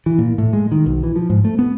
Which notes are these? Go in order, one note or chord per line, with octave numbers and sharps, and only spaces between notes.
E3
A#2
A2
G#3
D#3
B1
E3
F3
G#2
A3
B3